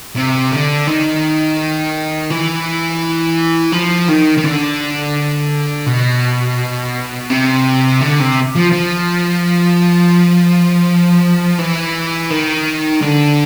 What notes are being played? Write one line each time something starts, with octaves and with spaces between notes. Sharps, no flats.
C3
D3
D#3
E3
F3
D#3
D#3
D3
B2
C3
D3
C3
F3
F3
E3
D#3
D3